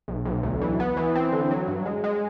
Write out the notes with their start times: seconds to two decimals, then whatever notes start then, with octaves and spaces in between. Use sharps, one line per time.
0.08 B1
0.25 B1
0.43 D2
0.61 E3
0.80 B3
0.97 E3
1.15 C4
1.32 D3
1.51 F#3
1.68 G2
1.86 G#3
2.04 G#3